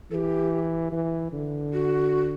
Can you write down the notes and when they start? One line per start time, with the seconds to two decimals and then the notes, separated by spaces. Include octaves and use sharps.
0.11 E3 G4 A4
0.92 E3
1.33 D3
1.73 F#4